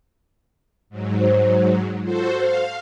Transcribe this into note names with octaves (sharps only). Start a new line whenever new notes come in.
G#2 F#3
C5
F4 F#4 A4 C5
C5 F5